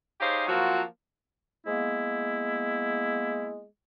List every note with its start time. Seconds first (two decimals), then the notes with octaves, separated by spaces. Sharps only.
0.20 D#4 G4 G#4 C5 C#5 F5
0.48 F3 F#3 A#3 C4 F4 F#4
1.67 G#3 A#3 B3 E4